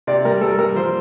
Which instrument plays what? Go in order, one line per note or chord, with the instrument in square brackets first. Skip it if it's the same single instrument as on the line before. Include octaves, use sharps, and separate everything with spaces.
[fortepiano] C3 D5
G3 A#4
G3 A4
G3 A#4
F3 C5